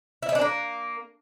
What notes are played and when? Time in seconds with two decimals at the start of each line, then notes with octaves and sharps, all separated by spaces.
0.23 E4
0.29 D#4
0.35 D4
0.41 A#3